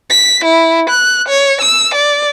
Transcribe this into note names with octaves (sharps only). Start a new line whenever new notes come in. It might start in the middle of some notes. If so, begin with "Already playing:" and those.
B6
E4
F#6
C#5
E6
D5